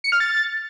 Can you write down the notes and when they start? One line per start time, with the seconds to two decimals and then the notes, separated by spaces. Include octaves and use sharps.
0.04 C#7
0.12 F6
0.20 A6